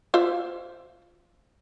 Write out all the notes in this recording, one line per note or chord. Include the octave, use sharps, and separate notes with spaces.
F4 C5 E5